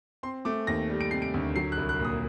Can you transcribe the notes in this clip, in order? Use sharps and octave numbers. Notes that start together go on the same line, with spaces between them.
C4 C6
A3 D6
D#2 A#6
G3
D7
C3 C7
D7
D2
F#3 C7
F#6
C2
F#6
A#2 D#6